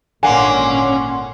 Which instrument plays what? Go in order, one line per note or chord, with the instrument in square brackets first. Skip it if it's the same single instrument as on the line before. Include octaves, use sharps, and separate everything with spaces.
[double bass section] G#1 A#2 C#4 [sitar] D3 A#3 [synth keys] F#5 C6 [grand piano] G#5